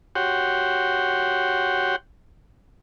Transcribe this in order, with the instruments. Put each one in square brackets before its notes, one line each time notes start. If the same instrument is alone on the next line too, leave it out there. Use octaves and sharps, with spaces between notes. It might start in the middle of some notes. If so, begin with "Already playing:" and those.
[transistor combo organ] F#4 G4 C#5 F#5 G5 C6